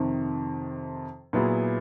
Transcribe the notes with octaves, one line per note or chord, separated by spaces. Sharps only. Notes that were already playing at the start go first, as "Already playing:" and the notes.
Already playing: F2 C3 D#3
A#2 F#3 B3 E4 G#4